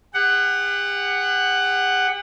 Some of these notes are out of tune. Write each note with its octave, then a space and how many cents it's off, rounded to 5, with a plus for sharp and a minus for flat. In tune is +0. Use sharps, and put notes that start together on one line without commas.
G4 +45 F#5 +10